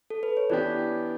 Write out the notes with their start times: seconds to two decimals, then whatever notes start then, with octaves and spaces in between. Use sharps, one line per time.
0.10 A4
0.23 B4
0.37 C#5
0.50 E3 B3 D4 G4 D5